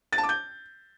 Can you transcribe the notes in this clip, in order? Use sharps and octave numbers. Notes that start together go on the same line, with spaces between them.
A6
A5
D6
G6